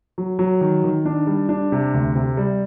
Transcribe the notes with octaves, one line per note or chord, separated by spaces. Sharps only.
F#3
F#3
D#3
D#3
D4
G3
D4
C3
D2
C3
G3